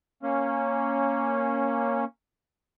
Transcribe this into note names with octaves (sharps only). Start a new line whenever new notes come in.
A#3 C#4